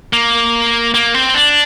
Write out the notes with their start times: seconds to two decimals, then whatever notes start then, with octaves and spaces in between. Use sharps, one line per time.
0.13 A#3
0.94 A#3
1.14 C4
1.35 D4